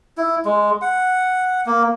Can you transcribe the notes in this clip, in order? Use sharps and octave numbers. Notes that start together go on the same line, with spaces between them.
E4
G#3
F#5
A#3